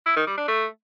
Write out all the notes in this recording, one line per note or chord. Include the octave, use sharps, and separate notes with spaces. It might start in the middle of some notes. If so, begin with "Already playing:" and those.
E4
D#3
G3
D4
A3